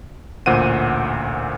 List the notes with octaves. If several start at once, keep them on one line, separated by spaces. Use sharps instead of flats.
A1 D2 A#2 C5 F#5 D#7